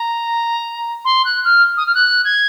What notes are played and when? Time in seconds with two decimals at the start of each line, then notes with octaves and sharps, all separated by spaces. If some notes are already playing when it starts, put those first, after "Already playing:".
Already playing: A#5
1.05 C6
1.25 F#6
1.44 F6
1.77 D#6
1.86 F6
1.95 F#6
2.25 G#6